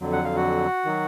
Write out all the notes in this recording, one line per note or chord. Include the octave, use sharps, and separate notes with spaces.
F2 D3 F#3
F#5
F5
F#4 F#5
D#3 F#3